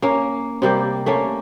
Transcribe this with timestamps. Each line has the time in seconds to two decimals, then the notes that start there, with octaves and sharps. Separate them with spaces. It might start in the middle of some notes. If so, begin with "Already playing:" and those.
0.02 A#3 C#4
0.62 C3 G3 A#3 G4
1.06 A3 A#3 C#4